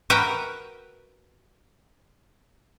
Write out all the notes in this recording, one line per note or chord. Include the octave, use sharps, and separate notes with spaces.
F#4 A#4 B4 E5 F#5 G5